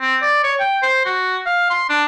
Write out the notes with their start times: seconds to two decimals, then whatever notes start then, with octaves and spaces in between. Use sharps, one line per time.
0.01 C4
0.22 D5
0.44 C#5
0.60 G5
0.83 C5
1.05 F#4
1.46 F5
1.70 C6
1.89 D4